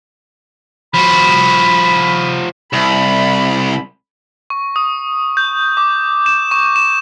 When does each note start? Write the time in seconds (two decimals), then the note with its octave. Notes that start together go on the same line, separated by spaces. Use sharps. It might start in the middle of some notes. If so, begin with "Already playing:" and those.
0.94 F3 F#4 B5
2.73 C2 B5
4.50 C#6
4.76 D#6
5.37 G6
5.77 D6
6.26 E7
6.51 C#6
6.76 E7